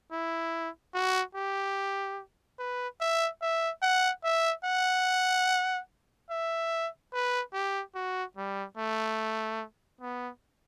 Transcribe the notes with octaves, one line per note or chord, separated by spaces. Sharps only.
E4
F#4
G4
B4
E5
E5
F#5
E5
F#5
E5
B4
G4
F#4
G3
A3
B3